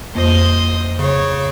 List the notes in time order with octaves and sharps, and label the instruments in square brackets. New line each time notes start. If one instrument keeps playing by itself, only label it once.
[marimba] F2 A#3 [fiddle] C5 D#5
[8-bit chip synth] C#3 [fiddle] C#5